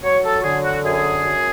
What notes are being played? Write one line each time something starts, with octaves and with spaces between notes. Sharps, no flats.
F#3 C#5
A4
F#4
D3 G#4
F#4
F#2 G#4
F#2